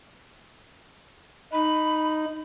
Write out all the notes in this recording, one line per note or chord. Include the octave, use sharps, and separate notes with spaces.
D#4 B5